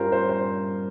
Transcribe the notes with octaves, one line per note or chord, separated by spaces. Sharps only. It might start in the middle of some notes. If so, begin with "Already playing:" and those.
Already playing: G2 G3 C#4 F4 A#4 C5
C5
C5